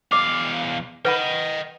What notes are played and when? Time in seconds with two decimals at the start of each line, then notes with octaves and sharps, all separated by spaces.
0.12 E2 D#5 F5 D6
1.05 B4 D#5 F#5 G5 B5